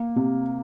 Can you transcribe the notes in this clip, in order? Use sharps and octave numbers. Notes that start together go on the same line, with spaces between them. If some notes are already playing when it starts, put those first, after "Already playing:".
Already playing: A#3
C3